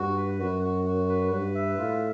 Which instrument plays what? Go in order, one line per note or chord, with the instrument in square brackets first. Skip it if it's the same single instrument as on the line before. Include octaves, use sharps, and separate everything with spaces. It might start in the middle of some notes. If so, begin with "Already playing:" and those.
Already playing: [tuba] G2 [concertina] F#4
[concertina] B4
[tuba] F#2 [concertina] F#4
[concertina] F#4
F#4
B4
[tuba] G2 [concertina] B4
[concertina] E5
[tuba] A2 [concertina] F4